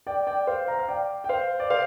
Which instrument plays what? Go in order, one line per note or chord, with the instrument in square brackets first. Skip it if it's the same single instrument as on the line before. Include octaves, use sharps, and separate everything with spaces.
[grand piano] D5 G5
D5 G5
C5 F5
F5 A#5
F5
D5 G5
G5
C5 F5
D5
C5 F5